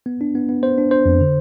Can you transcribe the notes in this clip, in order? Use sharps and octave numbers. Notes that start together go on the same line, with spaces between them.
B3
D4
B3
B3
B3 C5
D4
D4 C5
F2
D3